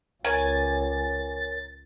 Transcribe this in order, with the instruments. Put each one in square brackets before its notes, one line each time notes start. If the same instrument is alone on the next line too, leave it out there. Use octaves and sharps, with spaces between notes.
[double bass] C#2 [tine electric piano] A#4 C#5 [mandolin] G#5 [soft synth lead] A6